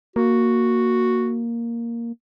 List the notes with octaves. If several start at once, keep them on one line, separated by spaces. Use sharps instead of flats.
A#3 F#4